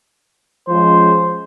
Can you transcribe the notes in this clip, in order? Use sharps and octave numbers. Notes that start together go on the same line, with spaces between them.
F3 G#3 C#4 C5